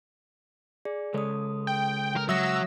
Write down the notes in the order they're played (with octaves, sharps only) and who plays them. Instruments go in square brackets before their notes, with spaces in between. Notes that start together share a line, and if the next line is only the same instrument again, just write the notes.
[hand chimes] G#4 D5
[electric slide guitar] C#3 G#3 C#5 [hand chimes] A4 D#6
[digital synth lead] G5
[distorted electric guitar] A#4
[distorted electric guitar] F#3 [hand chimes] E5 D#6 A#6 [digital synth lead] E6